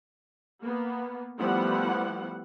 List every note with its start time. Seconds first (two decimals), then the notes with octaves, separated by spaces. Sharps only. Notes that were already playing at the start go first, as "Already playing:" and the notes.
0.61 A#3 B3
1.38 F3 G3 A3 B3 E4 F#5